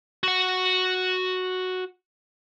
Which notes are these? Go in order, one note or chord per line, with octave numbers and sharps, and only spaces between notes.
F#4 F#5